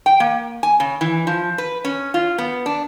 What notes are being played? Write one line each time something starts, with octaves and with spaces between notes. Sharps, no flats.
G5
A#3
G#5
C#3
E3
F3
B4
C#4
F4
B3
D4